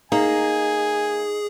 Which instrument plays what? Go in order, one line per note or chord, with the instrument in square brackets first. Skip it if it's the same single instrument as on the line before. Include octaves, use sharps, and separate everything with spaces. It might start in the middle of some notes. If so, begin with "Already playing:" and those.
[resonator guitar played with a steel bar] A#3 [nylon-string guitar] D#4 [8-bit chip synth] G#4 [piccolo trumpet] G#5